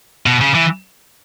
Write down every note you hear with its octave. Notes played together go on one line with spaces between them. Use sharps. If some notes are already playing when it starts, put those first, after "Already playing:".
B2
C#3
E3